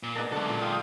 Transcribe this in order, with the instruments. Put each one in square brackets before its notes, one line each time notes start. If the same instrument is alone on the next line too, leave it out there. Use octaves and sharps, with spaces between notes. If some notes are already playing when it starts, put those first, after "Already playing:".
[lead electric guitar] A#2
[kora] B3 D#4 A#4 [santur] D4 G#4 A5
[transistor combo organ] D3 [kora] F#3 [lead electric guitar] G#3 A4 [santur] A3 D4
[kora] A#2
[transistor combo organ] F4 G5 D#6